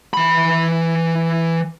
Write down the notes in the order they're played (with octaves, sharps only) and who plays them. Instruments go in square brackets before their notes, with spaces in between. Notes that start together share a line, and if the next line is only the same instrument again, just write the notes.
[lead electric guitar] E3 B5